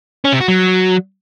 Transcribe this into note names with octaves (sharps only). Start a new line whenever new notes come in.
C#4
C3
F#4
F#3